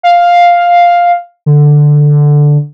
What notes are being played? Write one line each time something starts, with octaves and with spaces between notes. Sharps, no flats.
F5
D3